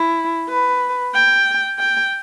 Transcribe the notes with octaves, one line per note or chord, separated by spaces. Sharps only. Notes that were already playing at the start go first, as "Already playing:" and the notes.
Already playing: E4
B4
G5
G5